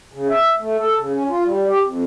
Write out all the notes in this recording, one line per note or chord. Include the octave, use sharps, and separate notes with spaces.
C#3
E5
A3
A4
C#3
C#4
F4
G3
G4
F2